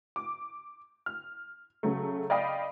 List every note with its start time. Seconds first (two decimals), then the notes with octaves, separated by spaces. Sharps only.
0.16 D6
1.06 F6
1.83 C#3 F#3 A3
2.30 D5 D#5 F5 G5 B5 D#6